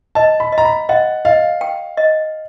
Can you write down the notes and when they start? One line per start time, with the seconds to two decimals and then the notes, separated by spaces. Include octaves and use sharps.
0.15 D#5 A5
0.40 B5
0.52 D#5
0.58 A#5
0.65 B5
0.89 D#5 F#5
1.25 D#5 F5
1.61 G5
1.97 D#5